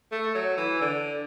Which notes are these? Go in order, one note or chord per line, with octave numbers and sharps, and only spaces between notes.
A3
F#3
E3
D3